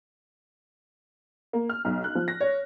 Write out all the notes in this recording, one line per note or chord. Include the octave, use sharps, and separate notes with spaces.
A#3
F6
B1
F#6
F3
A#6
C#5